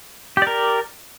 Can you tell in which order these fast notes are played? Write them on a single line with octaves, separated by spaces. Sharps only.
G4 D5 A#4